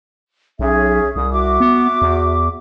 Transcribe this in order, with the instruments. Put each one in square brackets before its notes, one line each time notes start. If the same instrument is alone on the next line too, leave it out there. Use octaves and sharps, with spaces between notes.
[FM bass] B1 [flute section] C#4 G#4 E5
[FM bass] C2 [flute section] D#6
[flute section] F#4 E5 D6
[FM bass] B3
E2